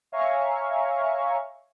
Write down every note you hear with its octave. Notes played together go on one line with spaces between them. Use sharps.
C#5 E5 F5 G#5 A#5 C#6